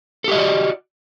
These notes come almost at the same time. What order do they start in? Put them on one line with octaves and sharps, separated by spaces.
A4 G4 D#5 F#4 D5